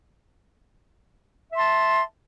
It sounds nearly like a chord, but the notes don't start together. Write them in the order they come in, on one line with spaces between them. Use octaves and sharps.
E5 C6 A5